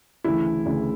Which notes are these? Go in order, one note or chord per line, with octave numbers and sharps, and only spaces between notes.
D2 C#3 E3 E4
D2 C#3 E3